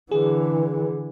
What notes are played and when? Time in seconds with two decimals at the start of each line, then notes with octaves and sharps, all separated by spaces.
0.11 D3 E3 G#4